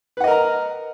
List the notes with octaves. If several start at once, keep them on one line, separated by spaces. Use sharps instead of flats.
A#4 B4 D#5 F#5 A#5